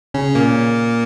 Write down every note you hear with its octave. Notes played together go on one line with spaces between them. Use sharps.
C#3 C#4
A#2 A#3